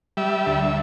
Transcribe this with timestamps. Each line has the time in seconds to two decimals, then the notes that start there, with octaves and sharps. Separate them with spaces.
0.17 G3 E5
0.46 D2